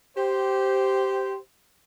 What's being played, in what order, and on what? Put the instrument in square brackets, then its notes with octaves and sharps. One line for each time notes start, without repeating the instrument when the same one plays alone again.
[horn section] G4 C5